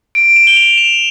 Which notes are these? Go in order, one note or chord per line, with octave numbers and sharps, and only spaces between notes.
D7
E7
G7
F7
E7